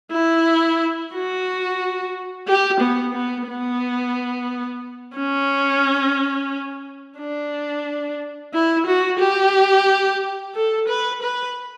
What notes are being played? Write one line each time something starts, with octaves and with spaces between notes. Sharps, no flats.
E4
F#4
G4
B3
B3
B3
C#4
D4
E4
F#4
G4
A4
B4
B4